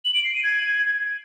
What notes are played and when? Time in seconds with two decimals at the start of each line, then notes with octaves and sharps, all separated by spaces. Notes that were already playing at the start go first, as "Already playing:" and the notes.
0.05 F#7
0.15 D7
0.24 C7
0.34 D#7
0.44 G#6